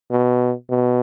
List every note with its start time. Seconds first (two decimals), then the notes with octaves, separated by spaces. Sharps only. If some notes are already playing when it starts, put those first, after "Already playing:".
0.11 B2
0.70 B2